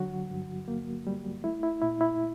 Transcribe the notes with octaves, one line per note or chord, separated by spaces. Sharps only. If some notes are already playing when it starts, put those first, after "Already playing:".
Already playing: D3 F#3 F#4
G2
A#3
G3
A3 E4
E4
A#2 E4
E4